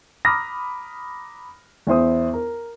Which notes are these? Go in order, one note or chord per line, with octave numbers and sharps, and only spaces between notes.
A#5 B5 D6 D#6 F6 A#6
E2 E4 C5 D#6
A#4